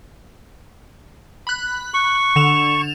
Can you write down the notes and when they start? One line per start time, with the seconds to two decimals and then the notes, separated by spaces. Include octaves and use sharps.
1.47 B5 F#6
1.94 C#6
2.36 D3 E7 F7